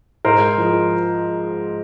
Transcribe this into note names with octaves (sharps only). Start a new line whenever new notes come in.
G#2 A#4 C5
F3 G#3